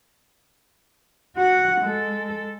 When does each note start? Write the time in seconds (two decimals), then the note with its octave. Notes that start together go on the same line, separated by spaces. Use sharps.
1.37 F#4 F#5
1.81 G#3 A4